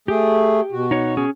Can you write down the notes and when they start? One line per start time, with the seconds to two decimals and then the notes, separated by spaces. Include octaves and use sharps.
0.08 A3 G4 G#4
0.72 B2 F#4
0.91 D#4 C#5
1.17 C#4 G#4